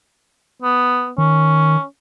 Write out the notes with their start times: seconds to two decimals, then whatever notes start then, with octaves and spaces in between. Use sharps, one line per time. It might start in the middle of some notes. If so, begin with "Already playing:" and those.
0.62 B3
1.18 D#3 C#4